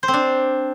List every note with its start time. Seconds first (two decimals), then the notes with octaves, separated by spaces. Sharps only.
0.03 C5
0.08 C4
0.14 D4